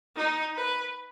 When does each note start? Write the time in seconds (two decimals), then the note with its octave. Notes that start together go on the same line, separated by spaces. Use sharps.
0.16 D#4
0.56 B4